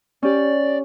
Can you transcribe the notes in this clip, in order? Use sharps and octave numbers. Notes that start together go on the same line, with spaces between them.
C#4 G4 D5